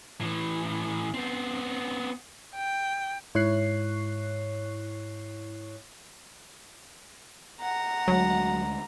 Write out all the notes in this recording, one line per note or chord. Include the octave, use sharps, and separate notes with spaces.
A2 E3
B3 C4
G5
G#2 E4 C#5 C#6 F#6 C7
F#5 A#5
D2 F#3 G#3